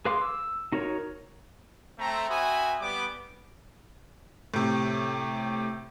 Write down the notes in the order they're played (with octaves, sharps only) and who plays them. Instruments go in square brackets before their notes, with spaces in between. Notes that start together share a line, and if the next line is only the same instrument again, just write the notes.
[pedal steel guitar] G#4 B4 F5 C6 D6
E6
D#4 F#4 A#4 C#5
[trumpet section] A3 C4 A#5
C4 F#4 E5 G#5 B5 D#6
G3 B3 D6
[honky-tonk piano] A2 C3